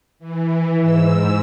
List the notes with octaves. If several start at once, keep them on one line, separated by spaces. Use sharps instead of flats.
E3
G#2 E6